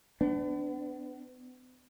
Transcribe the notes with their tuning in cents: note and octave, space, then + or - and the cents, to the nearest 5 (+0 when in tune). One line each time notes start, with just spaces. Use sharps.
B3 +40 D4 +0